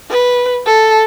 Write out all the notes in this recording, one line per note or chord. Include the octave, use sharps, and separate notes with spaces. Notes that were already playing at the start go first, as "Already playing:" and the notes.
B4
A4